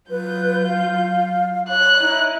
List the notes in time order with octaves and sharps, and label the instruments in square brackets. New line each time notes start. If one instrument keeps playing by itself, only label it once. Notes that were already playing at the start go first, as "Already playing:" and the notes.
[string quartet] F#3 F4 G6 [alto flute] B4
[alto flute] F5
[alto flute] C#5 [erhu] F#6
[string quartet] D#4 E4